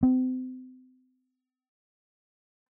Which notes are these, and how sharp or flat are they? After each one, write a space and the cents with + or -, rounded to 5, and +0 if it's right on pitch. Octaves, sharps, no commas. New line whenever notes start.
C4 -35